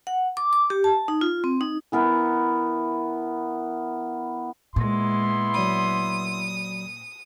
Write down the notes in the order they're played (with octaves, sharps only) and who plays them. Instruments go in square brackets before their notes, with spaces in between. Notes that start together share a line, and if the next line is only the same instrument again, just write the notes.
[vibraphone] F#5
D6
D6
G4
A5
D#4
F4
C4
D#4
[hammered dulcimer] E3 B3 A#4
[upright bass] A#2 [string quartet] G#3 [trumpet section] B3 E4 C6
[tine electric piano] F#3 D5 B5 [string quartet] D#6